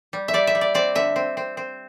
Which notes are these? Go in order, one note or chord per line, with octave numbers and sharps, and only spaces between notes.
G3
E5
G3 D5
E5
G3
D5
C4 D5
D3 E5
C4
C4
C4